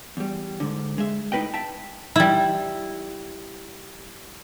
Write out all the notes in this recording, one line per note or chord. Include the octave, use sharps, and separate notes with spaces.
E2 G3
G#2 D3
G#3 E5
A2 D#4 F4 B4 D#5 G5
E5 G5 A5
G3 E4